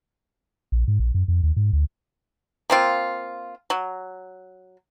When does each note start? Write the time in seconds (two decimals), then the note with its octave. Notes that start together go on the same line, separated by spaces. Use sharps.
0.72 A#1
0.88 G#2
1.00 A#1
1.15 F#2
1.28 F2
1.43 D#2
1.57 G#2
1.73 D2
2.70 A#3 C4 F4
3.70 F#3